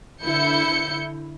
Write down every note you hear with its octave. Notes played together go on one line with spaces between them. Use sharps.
D3 E4 G6 C#7